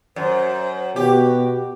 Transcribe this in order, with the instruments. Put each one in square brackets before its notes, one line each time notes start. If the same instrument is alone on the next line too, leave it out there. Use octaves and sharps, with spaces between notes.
[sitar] F#2 [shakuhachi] C5
[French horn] B2 [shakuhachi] F#4 [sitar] G4